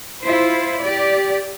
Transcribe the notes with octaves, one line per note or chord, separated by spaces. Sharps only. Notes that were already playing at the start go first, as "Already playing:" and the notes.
E4 F4 C5
G4 D5